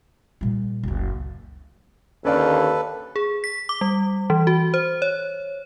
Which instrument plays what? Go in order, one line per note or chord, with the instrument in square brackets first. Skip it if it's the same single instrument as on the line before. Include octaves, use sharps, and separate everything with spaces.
[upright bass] A#2 G3
F#1 C#2
[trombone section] D#2 D3 [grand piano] C#4 D5 F5 [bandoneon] A4 B4
[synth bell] G#4
B6
D6
G3
E3
F#4
C5
C#5